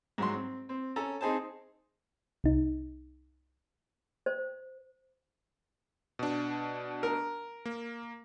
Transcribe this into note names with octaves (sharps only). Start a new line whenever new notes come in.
G#2 F#3 C6
C4
C4
C#4 A4 A#5
C4 D#4 G#4 C5 A5
C2 D#4
C5
B2 D4
A#4
A#3